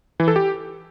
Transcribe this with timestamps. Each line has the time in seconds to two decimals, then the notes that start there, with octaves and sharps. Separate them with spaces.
0.20 E3
0.28 A4
0.36 G4